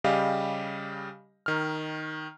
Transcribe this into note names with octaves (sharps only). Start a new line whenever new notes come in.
C#3 G3 G4 D#5 F5
D#3 F6